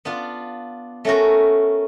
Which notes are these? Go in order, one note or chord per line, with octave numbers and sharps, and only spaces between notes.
B3 D4 F4
A3 C#4 F#4 A#4